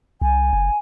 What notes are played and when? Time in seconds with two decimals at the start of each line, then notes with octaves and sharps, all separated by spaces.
0.22 C2 G#5
0.53 F#1